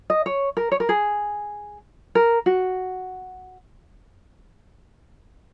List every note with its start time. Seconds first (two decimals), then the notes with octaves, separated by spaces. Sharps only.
0.10 D#5
0.26 C#5
0.57 A#4
0.72 C#5
0.80 A#4
0.89 G#4
2.15 A#4
2.46 F#4